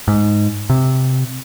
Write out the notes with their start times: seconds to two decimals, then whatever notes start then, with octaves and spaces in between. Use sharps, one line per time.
0.08 G#2
0.70 C3